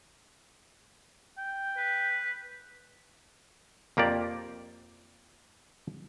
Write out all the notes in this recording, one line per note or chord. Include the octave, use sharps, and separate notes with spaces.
G5
B4
F2 A#3 G4 D5